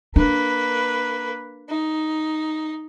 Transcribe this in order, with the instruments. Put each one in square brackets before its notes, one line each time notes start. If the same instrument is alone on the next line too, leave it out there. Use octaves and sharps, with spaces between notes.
[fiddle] A#3 B4 [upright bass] D4
[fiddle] D#4